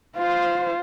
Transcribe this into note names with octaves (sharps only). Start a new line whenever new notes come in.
F4 C5